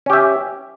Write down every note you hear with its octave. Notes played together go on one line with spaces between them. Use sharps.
C#4 G4 E5